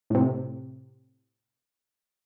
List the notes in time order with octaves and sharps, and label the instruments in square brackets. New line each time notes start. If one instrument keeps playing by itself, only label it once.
[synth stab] A2 C3